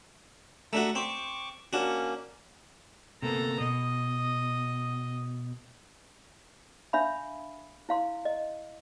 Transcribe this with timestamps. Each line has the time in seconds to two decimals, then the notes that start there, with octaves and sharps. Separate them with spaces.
0.73 A3 D4 F#4 E5 A#5 E6
0.95 C4 C#6 D6
1.73 A#3 C#4 D4 F#4
3.22 C3 A#3 B3 A4 A#5
3.60 B2 D#5
6.93 D4 E5 F5 B5
7.89 E4 F5 C6
8.25 D#5